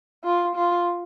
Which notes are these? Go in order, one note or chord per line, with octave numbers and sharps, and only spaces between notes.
F4
F4